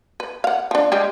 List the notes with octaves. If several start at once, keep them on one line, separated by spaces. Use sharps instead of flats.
B4
F5 F#5
F3 D4
G3 G#3 G4